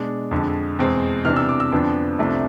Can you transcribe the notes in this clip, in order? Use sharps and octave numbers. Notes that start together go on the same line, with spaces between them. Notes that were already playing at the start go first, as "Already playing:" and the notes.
Already playing: B2 G#3 D4
F2 D3 G#3
E2 B2 G#3 C4
C3 E3 B3 D4 F6
E6
D6
E6
F2 D3 F3 B3 D4
C2 C3 F3 A3 D4